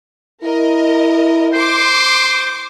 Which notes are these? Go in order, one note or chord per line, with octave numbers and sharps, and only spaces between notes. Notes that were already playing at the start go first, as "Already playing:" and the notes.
E4 A#4 D#5
C5 C6 D6